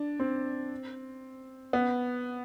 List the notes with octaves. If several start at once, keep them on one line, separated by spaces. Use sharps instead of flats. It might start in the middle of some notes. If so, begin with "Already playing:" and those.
Already playing: D4
C4
B3